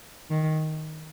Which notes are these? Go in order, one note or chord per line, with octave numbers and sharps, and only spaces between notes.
D#3